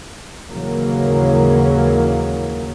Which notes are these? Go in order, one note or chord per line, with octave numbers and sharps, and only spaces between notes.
D#2 G#2 C#3 E3 F#3 A#3